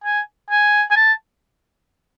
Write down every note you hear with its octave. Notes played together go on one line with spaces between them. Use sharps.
G#5
G#5
G#5
A5